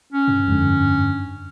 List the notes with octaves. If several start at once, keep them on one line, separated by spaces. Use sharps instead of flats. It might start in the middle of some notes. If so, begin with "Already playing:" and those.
C#4
G2
F2 G#2 D3